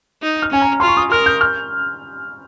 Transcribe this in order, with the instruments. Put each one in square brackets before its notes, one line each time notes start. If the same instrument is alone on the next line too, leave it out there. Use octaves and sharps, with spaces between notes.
[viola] D#4
[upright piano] F6
[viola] C#4 [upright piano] G#5
[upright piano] A#5
[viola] F4 [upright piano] C6
[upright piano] C#6
D#6
[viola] A#4 [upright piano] F6
[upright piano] G6
F6